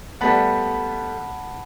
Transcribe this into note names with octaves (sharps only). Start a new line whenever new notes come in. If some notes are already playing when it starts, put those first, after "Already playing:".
G3 A3 B3 F#5 A5 B5